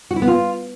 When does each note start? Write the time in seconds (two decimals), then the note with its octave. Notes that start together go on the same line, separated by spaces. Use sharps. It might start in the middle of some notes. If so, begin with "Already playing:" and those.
0.11 F#4
0.16 E4
0.22 B3
0.28 F4